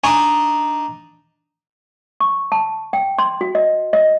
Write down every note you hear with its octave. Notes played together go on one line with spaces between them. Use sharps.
D4 D#4 G#5 C#6
C#6
A5
G5
C6
F#4
D#5
D#5